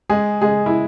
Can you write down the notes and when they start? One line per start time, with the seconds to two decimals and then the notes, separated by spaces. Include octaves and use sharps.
0.10 G#3 G#4
0.42 G#3 G#4
0.66 E4